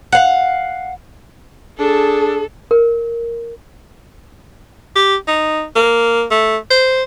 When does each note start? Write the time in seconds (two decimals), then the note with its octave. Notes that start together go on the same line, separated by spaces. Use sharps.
0.12 F5 F#5
1.79 D4 G#4 A4
2.71 A#4
4.95 G4
5.27 D#4
5.76 A#3
6.31 A3
6.70 C5